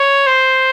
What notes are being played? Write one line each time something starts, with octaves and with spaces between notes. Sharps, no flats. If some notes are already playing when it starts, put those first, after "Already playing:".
Already playing: C#5
C5